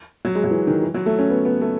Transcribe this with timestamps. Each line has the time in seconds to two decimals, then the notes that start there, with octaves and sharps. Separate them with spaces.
0.25 F#3
0.35 G#3
0.44 F#3
0.51 E3
0.67 D#3
0.82 E3
0.94 F#3
1.06 A3
1.19 C#4
1.30 B3
1.45 B3
1.61 A3